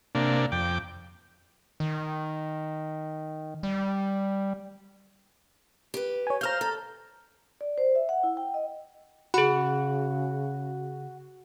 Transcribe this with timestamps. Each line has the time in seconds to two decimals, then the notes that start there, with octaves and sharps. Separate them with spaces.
0.15 C3 A#3 D4
0.52 F2 G5 D6
1.80 D#3
3.63 G3
5.94 G4 B4
6.27 C#5 G#5
6.41 C5 F5 A#5 F6 G6
6.61 A4
7.61 D5
7.78 C5
7.95 E5
8.09 F#5
8.23 E4
8.37 G5
8.54 D#5
9.34 C#3 F#4 G#4 F#5 B5